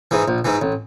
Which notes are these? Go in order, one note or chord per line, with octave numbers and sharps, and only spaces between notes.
G#2 E3
A#1
G#2 E3
A1